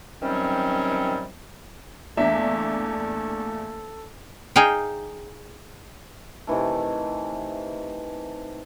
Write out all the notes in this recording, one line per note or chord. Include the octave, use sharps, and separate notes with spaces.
C3 D#3 F#3 G3 C4 C#4
E2 A3 A#3 D4 A4 E5
D#4 G#4 F5 G5
C3 D#3 E3 A3